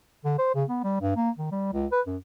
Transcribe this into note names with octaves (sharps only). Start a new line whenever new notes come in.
D3
C5
C#3
B3
G3
G2
A#3
D#3
G3
C#2
B4
F#2